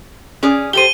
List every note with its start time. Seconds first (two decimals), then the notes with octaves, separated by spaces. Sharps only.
0.43 C#4 G#4 D5
0.73 G4 A4 C5 D#7 G7